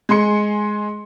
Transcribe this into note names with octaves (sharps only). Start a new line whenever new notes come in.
G#3 G#4 C6 C#7